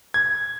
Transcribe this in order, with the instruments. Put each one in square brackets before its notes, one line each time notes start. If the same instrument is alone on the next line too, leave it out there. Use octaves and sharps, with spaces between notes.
[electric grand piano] G#6